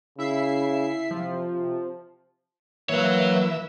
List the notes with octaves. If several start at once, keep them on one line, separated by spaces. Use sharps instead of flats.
C#3 E4 E5 C7
C3 F3
C3
E3 F#3 A#3 B4 C#5 E5